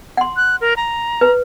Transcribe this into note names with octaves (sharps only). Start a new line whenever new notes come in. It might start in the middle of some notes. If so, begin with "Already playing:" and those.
F#5 C6
F#6
A#4
A#5
B4